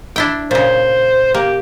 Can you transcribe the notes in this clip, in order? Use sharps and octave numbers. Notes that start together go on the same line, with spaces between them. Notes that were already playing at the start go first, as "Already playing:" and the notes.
D4 E4 G5
A#2 C#3 C5
A#3 G4